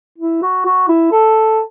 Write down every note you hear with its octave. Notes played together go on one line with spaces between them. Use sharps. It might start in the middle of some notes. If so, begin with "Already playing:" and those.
E4
F#4
F#4
E4
A4